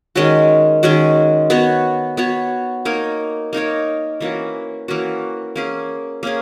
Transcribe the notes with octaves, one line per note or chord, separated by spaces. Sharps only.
D#3 G#3 C#4 F#4
D#3 G#3 C#4 F#4
B3 F#4 C#5
B3 F#4 C#5
A#3 D#4 A#4 C#5
A#3 D#4 A#4 C#5
E3 A#3 C#4 F#4
E3 A#3 C#4 F#4
A#3 C#4 G#4
A#3 C#4 G#4